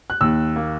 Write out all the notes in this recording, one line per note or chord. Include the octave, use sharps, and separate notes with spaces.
F#6
D#2 E6
A#3